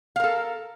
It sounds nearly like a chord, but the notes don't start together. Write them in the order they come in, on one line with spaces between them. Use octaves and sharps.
F5 A#4 A4